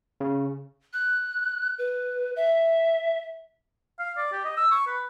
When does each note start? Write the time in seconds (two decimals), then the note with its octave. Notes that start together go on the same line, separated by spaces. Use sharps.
0.20 C#3
0.93 F#6
1.78 B4
2.36 E5
3.99 F5
4.17 D5
4.32 G4
4.45 D#5
4.57 E6
4.72 C#6
4.87 B4